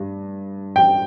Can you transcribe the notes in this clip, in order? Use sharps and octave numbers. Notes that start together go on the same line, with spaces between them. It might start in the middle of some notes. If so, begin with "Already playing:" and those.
Already playing: G2
G5